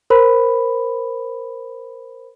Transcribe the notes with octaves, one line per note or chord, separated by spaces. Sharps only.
A#4 C5 B5